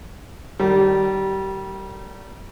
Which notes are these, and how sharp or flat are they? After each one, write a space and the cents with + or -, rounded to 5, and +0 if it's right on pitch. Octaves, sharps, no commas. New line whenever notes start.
D#3 -35 G3 -25